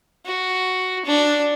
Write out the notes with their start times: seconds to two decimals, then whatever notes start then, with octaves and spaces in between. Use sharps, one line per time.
0.25 F#4
1.06 D4